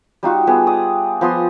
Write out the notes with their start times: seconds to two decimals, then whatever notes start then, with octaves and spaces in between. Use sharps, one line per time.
0.23 G3 D#4 F4 F#4
0.47 G3 B3 G#4
0.67 D5 D#6
1.21 F3 B3 C6 D#6